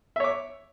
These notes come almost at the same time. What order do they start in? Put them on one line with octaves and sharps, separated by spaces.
E5 C#5 D6